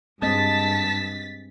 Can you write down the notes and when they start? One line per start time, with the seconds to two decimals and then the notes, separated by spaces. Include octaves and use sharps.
0.22 G2 G#3 C4 D#5 A5 A6 B6